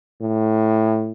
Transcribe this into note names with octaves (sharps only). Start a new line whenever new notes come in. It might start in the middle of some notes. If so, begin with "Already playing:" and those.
A2